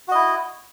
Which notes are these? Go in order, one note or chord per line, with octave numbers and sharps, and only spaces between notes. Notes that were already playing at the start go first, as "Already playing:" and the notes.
E4 F#4 D#5